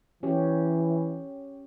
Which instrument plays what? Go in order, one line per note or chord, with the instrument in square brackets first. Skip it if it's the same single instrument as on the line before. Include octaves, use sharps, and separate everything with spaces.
[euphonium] E3 [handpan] C#4 G4